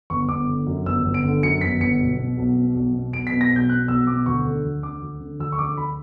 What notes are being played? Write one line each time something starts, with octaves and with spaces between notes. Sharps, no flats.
G1 C#6
G1 D6
D3
F#2
G1 E6
G1
D7
D3
F#2 C#7
G1 B6
G1 C#7
B1
B2
B1
B2
B1
B2
B1 D7
B6
B2
A#6
B1 G6
B2 F#6
B1 E6
B2 D6
D2 C#6
D3
D2
D3 D6
D2
D3
D2 E6
C#6
D3 D6
D2 B5